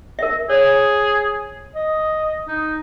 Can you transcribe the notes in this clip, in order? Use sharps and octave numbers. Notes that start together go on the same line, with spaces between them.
A#4 E5
G#4 C#5
D#5
D#4